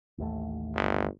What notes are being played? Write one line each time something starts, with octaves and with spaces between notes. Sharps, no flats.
A1 D#2 A3
G1